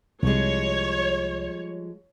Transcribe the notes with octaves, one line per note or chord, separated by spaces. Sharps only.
C2 F3 G3 G#3 C#5